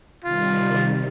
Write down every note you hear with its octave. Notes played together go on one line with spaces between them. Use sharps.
C3 D#3 G3 F4